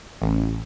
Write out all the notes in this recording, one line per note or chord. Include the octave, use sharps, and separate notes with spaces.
A1